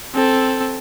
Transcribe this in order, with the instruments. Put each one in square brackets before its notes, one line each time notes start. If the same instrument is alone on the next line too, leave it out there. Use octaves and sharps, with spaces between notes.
[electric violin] C4 A4